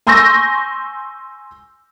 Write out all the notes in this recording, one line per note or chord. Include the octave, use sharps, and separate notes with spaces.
G#5 C6 C#6 E6 G6 A#6